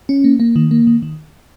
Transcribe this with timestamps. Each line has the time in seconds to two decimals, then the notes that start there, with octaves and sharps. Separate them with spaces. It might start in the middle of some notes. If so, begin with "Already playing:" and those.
0.09 C#4
0.24 A#3
0.40 A#3
0.56 D#3
0.71 A#3
0.87 D#3
1.02 D#3